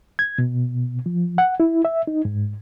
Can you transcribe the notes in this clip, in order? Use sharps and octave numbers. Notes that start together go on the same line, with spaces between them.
G#6
B2
F3
F#5
E4
E5
D#4
G#2